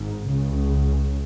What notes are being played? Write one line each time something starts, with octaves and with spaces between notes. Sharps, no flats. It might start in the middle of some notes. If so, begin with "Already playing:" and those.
Already playing: G#1 G#2
C#2 C#3